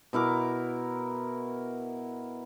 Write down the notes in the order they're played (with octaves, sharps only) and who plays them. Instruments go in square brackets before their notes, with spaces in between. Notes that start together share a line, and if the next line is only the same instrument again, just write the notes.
[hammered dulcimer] B2 E4 A#4 D6